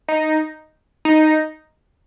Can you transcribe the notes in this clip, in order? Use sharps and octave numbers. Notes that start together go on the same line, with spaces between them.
D#4
D#4